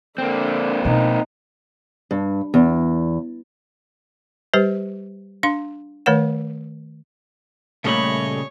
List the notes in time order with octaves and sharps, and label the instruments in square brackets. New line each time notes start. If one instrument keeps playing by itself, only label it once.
[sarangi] D3 [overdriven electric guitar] A#3 C4
[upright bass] B2 [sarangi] D#4
[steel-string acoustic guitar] G2
E2
[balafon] G3 G4 B4 C5
D4 F5 C6
D#3 A3 B4 C#5 F#5
[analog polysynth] A#2 G3 A3 [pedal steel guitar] C#3 D#5 B5 [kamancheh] C#5